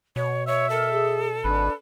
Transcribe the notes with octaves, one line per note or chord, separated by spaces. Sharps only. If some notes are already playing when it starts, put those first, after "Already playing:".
B2 C#5
C#5 E5
A4 A#4
G#4
G#1 D4 B4